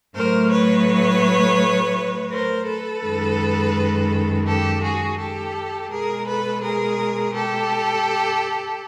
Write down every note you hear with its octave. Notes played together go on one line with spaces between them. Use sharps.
A2 F#3 A3 A#4 C5
B4 C#5
A#4 C5
A4 B4
F#2 D#3 G#3
G4 A4
F#4 G#4
G4 A4
B2 G#3 G#4 A#4
A4 B4
G#4 A#4
G4 A4